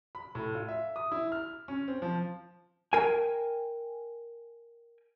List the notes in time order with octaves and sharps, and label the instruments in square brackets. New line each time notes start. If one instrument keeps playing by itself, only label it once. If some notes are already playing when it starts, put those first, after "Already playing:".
[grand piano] B5
A2
F4
E5
D#6
E4
F6
C#4
C4
F3
[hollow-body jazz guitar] A#4 G5 G#5